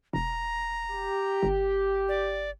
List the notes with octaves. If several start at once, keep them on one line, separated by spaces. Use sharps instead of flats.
E1 A#5
G4
G1
D5